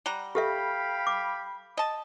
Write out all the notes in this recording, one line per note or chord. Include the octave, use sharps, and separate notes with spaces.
G3 F#5 A#5
G4 A4 E5 F5 G5 B5
D6
D#5 A5